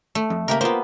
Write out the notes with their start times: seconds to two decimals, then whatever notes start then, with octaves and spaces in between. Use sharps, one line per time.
0.15 A3
0.30 F2
0.48 C#3 A#3 G4 A#4 E5
0.61 A#3 B3 F4 A#4 C5